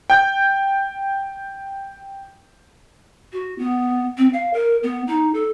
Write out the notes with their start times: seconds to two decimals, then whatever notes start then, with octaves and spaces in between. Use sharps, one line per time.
0.10 G5 G6
3.33 F#4
3.58 B3
4.18 C4
4.33 F5
4.54 A#4
4.83 B3
5.07 D#4
5.34 A4